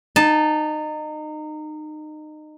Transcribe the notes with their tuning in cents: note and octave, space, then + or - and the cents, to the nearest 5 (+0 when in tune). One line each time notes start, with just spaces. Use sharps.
D#4 -25 A5 +0